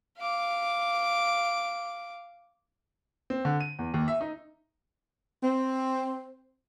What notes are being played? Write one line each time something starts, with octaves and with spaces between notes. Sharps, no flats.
F5 D6
C4
D3
D#7
E2
D#2
E5
D#4
C4